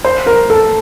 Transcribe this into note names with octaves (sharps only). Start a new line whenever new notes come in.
C5
A#4
A4